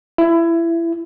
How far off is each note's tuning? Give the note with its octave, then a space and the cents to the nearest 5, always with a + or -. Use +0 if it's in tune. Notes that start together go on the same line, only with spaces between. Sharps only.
E4 +20